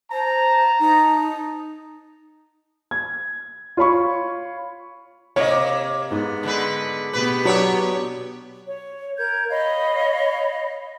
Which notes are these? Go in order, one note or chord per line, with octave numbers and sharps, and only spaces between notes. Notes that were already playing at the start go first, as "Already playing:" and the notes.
C5 A5 A#5
D#4
G#6
F4 C#5 B5 C#6
C3 A#3 C#5 D#5
G#2 B3
D3 G#3 B4
B2 B3 G4 B4
F#3 D4 C#5 D6
C#5
A#4 G6 G#6
C#5 D#5 F5 B5